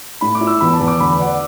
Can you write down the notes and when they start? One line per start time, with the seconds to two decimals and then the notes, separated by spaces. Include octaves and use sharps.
0.21 A2 B5
0.35 D6
0.41 E4
0.47 E6
0.60 E2 B5
0.73 A5
0.80 E2
0.87 D6
1.00 D2 B5
1.19 D4 F#5